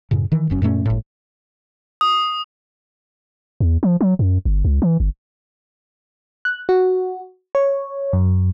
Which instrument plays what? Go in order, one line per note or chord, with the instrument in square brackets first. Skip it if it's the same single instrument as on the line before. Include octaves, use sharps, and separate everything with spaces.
[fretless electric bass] F#2 A2 C#3
D#3 E3
F1 F#2 C#4
F#2 A#2 A3 C#4
G1 A2
[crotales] D#6
[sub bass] E2
F3
F#3
F#2
G1
C#2
E3
G1
[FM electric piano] F#6
F#4
C#5
F#2